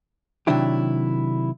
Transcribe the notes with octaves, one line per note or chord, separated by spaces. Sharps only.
C3 D#3 F#3 D4 E4 G4